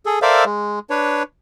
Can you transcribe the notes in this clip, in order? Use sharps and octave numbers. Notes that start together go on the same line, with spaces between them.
G#4 A4
A4 A#4 C5 D5 E5 F5
G#3
D4 B4 C#5